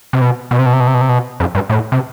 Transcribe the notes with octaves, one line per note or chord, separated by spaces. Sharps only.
C3
B2
B2
C3
B2
C3
B2
C3
B2
C3
B2
F2
G2
A2
C3